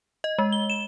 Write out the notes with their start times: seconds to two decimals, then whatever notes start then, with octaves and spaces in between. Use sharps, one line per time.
0.24 D#5
0.38 G#3
0.52 G7
0.70 E7